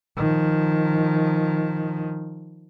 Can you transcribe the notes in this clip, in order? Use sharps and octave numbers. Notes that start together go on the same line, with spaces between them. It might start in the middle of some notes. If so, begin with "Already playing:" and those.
D#3 F3